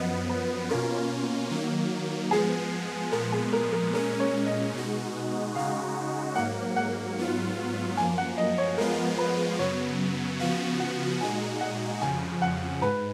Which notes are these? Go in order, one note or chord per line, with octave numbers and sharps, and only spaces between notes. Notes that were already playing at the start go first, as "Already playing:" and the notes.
Already playing: F#2 F3 B3 D#5
B4
B2 A#3 C#4 F4 A#4
D#3 F#3 A#3
F3 G#3 B3 G#4
A#2 F3 G#3 B3 A#4
G#4
A#4
A#4
A#2 G#3 C#4 A#4
C#5
D#5
B2 G#3 D#4 F#4
C#3 G#3 D#4 F#4 F5
G#2 F#3 A#3 F#5
F#5
G#2 F#3 B3 F4
F#2 F3 A#3 G#5
F#5
D#5
C#5
F3 G#3 B3 F4 A#4
B4
F#2 C#3 F#3 B3 C#5
C#3 F3 B3 F#4 F5
F#5
A#2 G#3 D#4 F#4 G#5
F#5
F2 C#3 F3 G#5
F#5
G#2 B4